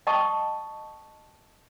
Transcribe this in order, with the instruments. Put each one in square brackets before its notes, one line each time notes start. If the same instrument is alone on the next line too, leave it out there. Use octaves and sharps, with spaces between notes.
[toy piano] D#5 G5 A5 C#6 D#6